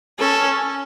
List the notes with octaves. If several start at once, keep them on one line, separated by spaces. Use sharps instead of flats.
C#4 A4